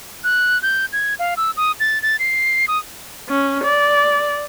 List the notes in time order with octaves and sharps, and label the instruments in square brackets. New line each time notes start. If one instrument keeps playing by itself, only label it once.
[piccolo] F#6
G6
G#6
F5
E6
D#6
A6
A6
C7
D#6
[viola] C#4
D5